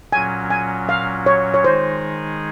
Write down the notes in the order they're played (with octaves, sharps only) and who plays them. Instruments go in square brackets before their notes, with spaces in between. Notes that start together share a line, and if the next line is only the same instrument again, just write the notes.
[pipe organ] A#2 F#3 C#4 [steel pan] G#5
[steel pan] G#5
F5
C#5
C#5
[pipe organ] D#3 G#3 D#4 G#4 [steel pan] C5